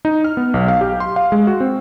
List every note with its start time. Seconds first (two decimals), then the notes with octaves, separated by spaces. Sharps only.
0.05 D#4
0.24 F6
0.37 B3
0.54 B1
0.68 F5
0.81 G4
1.00 C6
1.16 F5
1.32 G#3
1.47 F#4
1.60 C4